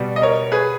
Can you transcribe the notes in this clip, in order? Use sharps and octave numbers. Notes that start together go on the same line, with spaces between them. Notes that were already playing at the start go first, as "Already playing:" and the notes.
Already playing: B2 G3
D#5
A#4 C#5
G#4 B4